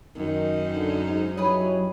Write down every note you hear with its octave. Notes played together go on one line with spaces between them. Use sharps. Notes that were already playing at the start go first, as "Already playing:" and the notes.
F#2 D#3 D#4
D3
G#2
F#3 E4 G4 G#4 B4 C#5 D#5